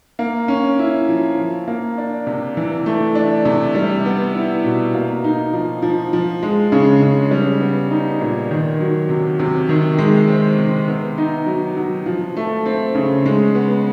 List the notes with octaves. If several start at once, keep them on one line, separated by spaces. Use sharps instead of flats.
A#3
C#4
E4
F3
F3
A#3
D4
C3
E3
A3
D4
C3
G3
B3
E4
B2
A#3
D#4
F3
F3
F3
G#3
C#3
C#3
G3
B3
D#4
A#2
D#3
F#3
C3
C3
D#3
G#3
C4
C3
B3
D#4
F#3
F#3
F3
A3
C4
C#3
G#3
B3